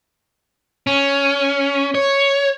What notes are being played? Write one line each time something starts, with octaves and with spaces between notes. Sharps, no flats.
C#4
C#5